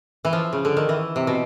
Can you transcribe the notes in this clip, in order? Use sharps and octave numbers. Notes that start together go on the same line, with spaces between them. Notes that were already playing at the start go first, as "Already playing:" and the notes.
E3
F3
C#3
D3
D#3
E3
C3
B2